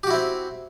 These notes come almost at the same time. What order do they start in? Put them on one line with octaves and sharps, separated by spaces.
G4 F#4 E4 C4